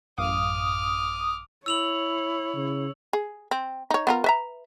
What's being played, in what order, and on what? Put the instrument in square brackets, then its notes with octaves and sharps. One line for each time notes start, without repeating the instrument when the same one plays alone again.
[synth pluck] A1 F#2 F5 [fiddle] D6 F6 [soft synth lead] D#6
[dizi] E4 [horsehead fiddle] C#5 [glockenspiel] E6 F7 F#7
[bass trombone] C#3
[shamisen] G#4
C4
D#4 C#5
B3 F4 A#4
B4 E5 A#5